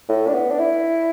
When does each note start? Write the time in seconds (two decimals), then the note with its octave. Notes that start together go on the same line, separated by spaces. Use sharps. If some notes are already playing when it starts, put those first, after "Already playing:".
0.09 A2
0.27 D4
0.34 B3
0.51 D4
0.59 E4